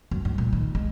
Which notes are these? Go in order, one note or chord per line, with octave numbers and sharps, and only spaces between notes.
F#2
G2
A#2
D#3
G#3